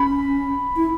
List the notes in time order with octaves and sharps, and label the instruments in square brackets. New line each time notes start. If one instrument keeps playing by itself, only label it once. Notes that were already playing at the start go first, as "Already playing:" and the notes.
Already playing: [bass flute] C#4 [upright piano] B5
[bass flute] E4